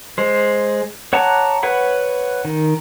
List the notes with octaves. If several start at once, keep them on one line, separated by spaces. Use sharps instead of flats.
G#3 C5
C#5 F#5 A5 A#5 D6
B4 C#5 F#5 B5
D#3